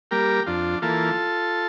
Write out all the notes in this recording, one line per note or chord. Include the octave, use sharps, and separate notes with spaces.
G3 A#3 G4 A#4
F2 D4 F4
E3 A#3 F4 A4